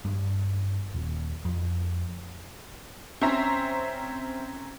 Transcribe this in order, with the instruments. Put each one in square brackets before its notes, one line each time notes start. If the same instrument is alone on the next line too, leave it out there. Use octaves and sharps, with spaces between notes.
[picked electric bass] G2
D#1
F2
[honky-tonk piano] C4 C#4 C5 E5 A#5 C6